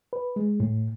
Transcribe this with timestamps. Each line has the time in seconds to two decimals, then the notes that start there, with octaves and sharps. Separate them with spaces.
0.13 B4
0.36 G#3
0.60 A2